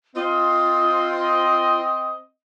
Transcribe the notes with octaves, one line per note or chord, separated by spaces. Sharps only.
C4 F4 D#5